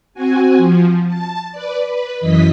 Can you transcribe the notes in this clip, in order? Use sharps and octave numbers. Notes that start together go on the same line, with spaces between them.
C4 F#4 G#5
F3
A5
B4 D5
B4
F#2 E3 D#5 B6